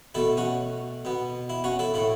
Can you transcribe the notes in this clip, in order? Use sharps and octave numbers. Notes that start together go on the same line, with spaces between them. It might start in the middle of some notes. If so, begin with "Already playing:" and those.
B2 A3 E4 A4
C#4 F#4
B2 B3
E4
C#4 F#4
E4 A4
A2 A3 E4